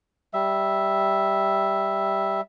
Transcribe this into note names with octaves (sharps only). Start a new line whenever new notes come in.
G3 E5